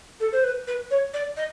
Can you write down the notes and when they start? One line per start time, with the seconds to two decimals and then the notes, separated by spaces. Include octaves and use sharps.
0.20 A4
0.33 C5
0.44 B4
0.67 B4
0.91 C#5
1.14 D5
1.37 D#5